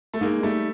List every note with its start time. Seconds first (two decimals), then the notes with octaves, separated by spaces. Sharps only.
0.14 A3
0.21 G#3 A#3 D#4
0.43 G3 A3 D#4